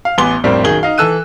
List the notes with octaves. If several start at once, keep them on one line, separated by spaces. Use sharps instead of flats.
F5
A1 B3 G#5 C6 D6 G7
F2 A2 G3 A#3 C4 D4
B1 F#2 D#3 G#4 G7
D#4 F5
E3 A4 E6 F#6 D#7